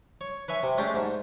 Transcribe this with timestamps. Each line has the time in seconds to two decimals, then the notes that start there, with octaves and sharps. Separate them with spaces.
0.21 C#5
0.48 B4 C#5 E5 G#5
0.63 C3
0.78 G#3 A3 C#4 D4 G4 G5
0.95 G#2